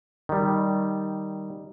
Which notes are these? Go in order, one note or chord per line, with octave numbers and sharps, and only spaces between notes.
D#3 G3